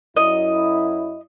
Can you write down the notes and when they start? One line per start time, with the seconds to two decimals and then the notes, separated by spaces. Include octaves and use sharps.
0.17 F#2 F#3 E4 D#5